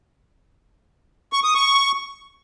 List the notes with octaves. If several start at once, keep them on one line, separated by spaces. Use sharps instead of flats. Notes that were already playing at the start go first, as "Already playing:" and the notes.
C#6
D#6
C#6